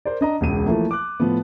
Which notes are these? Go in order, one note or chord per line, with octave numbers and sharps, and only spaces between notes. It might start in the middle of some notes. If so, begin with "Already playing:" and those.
A#4 C5 D5
D4 D#5 A#5
E1 C#2 D#7
E3 F3 A3 A#3
D6 F#6
A2 F3 B3